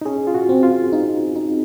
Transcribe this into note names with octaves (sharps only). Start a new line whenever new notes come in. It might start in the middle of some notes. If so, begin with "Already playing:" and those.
D#4
C#4 G#4
F4
F#4
C4
F4
D#4
D#4